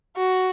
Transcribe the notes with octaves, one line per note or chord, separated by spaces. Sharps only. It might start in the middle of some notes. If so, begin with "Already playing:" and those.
F#4